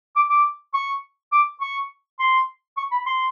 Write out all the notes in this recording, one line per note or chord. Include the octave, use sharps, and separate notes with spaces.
D6
D6
C#6
D6
C#6
C6
C#6
B5
C6